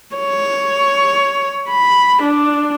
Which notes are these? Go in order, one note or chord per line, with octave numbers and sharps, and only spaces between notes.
C#5
B5
D4